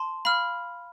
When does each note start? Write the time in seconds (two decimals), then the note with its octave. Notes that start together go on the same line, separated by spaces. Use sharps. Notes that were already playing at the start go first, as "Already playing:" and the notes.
Already playing: A5 C6
0.25 F5 B5 F6